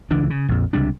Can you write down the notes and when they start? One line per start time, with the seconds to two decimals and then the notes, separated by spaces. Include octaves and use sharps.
0.11 C#2 E3 D4
0.30 C#3
0.49 A#1 F2
0.73 C#2 C3 G3 D4